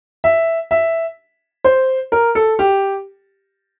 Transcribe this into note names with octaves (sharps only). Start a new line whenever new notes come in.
E5
E5
C5
A#4
A4
G4